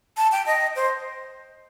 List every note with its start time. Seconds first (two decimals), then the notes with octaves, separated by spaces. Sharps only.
0.17 A5
0.32 G5
0.46 D#5
0.76 C5